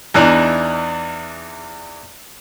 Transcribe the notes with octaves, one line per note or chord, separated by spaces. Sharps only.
E2 E3 D4 D#4 A#5